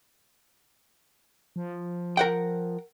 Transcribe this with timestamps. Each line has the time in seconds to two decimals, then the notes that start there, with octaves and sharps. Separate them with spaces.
1.56 F3
2.17 A#4 F#5 G5